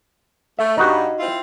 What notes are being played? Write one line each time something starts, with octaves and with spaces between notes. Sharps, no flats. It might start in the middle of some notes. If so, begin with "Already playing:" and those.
A3 E5
G2 D#4 F#4
C4 E4 F4